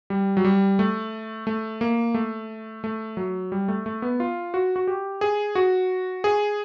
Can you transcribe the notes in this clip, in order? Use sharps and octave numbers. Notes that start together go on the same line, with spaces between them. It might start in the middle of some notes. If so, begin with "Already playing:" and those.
G3
F#3
G3
A3
A3
A#3
A3
A3
F#3
G3
A3
A3
B3
F4
F#4
F#4
G4
G#4
F#4
G#4